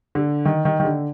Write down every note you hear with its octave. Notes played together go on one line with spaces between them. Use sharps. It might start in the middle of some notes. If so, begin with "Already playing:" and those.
D3
D#3
D#3
D#3
D3